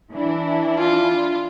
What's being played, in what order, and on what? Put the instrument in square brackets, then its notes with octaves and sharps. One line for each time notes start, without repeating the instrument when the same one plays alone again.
[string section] E3 D4 E4
[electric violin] F4